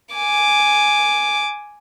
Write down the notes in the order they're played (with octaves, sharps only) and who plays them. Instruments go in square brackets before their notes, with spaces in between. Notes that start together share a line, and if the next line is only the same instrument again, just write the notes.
[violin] G#5 D6